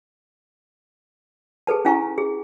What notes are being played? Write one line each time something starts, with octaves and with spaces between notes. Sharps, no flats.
G#4 A4 B4 A5
C#4 E4 F5 G#5 A#5 C#6
G#4